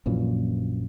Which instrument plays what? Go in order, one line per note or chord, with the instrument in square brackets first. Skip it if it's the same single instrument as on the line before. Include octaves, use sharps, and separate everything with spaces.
[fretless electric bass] A#1 F#2 A#2 E3